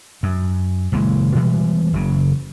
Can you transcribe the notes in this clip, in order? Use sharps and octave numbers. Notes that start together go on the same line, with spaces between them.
F#2
F#1 A#2 E3 G#3
B2 E3 G3 G#3
F#1 C#3